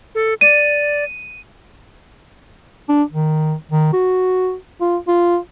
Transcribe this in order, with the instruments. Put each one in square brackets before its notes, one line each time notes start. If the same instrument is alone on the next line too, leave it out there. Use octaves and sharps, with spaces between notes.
[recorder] A4
[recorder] D5 [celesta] D#7
[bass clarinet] D4
D#3
D#3
F#4
F4
F4